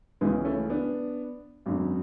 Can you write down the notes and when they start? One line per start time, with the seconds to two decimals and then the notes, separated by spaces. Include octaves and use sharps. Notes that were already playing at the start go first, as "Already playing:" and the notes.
0.21 C#2 C#3 E3 G#3 B3
0.45 A3 C#4
0.70 B3 D4
1.66 G#1 F#2 D3